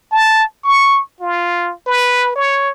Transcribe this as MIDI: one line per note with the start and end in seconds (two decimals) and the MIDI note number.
0.12 0.44 81
0.64 1.01 85
1.21 1.73 65
1.87 2.33 71
2.36 2.70 73